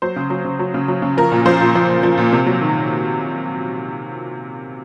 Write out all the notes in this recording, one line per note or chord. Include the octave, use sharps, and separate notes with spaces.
F#3 C5
C#3
F#3
C#3
F#3
C#3
F#3
C#3
F3 A#4
A#2
F3 C5
A#2
F3
A#2
F3
A#2
C3
F#3
D#3